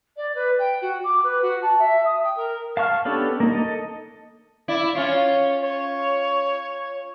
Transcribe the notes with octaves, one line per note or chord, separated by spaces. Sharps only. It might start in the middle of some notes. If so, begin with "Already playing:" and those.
D5
B4
G5
F#4
D6
B4
F#4
A5
E5
D#6
G5
A#4
F5 A5 C#6 F6
B3 C#4 D4 G4 A4
A#3 D#4
A4 D#5
E4 D5
C#4 F4 C#5
C#5